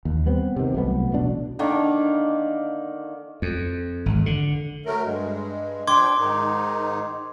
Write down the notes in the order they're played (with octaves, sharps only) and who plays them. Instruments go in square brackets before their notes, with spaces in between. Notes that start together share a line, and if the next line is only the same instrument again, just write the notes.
[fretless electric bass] D#2
G3 B3 C4
C3 D#3
C2 F#3 A3 B3
E1 A1 B2 D4
[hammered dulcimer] D3 D#3 A#3
[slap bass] F2
G#1
D3
[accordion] F#3 A3 A#4
G2 G#3
[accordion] F3 D4 G5 [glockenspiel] C6 D6 G#6
[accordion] G#2 D#3 D#4